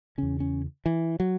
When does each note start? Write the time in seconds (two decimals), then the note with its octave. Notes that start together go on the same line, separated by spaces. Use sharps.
0.18 E2 C#3 C#4
0.40 C#4
0.86 E3
1.20 F#3